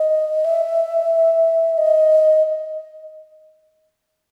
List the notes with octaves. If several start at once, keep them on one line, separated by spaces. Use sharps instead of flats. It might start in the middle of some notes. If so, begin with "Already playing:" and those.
Already playing: D#5
E5
D#5